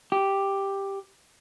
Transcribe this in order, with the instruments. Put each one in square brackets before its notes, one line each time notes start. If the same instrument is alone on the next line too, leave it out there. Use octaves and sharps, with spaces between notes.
[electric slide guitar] G4